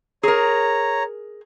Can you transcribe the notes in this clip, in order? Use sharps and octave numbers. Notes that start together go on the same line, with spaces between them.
G#4 A#4 C#5 A#5